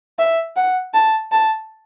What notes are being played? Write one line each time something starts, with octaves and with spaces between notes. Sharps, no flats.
E5
F#5
A5
A5